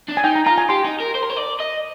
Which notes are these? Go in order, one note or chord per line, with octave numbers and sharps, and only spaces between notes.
D4
G#5
D#4 G5
A#5
F4 A#5
G#5
G4 C6
D#4
A#4
C5
A#4
C5
D5
D#5